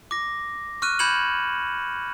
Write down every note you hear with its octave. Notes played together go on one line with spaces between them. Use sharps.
D6 A#6
C#6 F6 F#6 D#7
B5 G6 G#6 C#7 E7 F#7